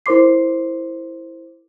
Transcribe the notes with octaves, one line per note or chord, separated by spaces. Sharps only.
E4 A#4 C5 C6 D6 C7